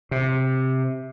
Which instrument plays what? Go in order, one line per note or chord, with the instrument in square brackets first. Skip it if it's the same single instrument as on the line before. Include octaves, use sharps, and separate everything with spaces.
[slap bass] C3